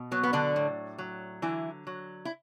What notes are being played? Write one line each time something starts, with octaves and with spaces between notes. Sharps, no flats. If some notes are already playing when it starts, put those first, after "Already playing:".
Already playing: B2
F#3 B3
B3
D3 D4
A2
F#3
D3 E3 E4
F#3
E4